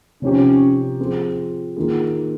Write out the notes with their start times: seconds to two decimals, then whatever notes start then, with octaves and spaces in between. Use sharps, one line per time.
0.22 C3 F3 C4 C#4 D#4 G4
0.99 F3 C4 F4 G#4
1.77 D#3 A#3 F4 G#4